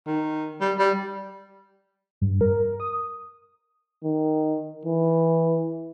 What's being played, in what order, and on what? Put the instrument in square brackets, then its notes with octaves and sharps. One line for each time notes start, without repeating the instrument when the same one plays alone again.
[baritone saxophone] D#3
G3
G3
[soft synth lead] G2
A#4
D#6
[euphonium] D#3
E3